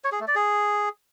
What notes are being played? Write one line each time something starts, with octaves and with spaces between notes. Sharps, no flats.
C#5
G#4
A3
D5
G#4